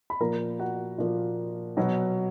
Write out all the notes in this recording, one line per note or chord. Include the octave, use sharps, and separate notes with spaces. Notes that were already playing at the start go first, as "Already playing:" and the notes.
B5
A#2 F3 A#3 A#4 A#5
F#4 F#5
A#2 F3 A#3
B2 F#3 B3